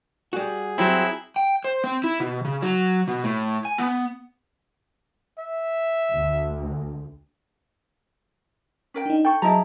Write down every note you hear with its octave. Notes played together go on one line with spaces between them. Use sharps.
G3 F#4 G#4
F#3 C4 E4
G5
C5
C4
E4
B2
C#3
F#3
B2
A2
G#5
B3
E5
D2
C#4 A#4 G5
D4 D#4
A4 G5 C#6
F#3 E4 G#4 D#5 A5 A#5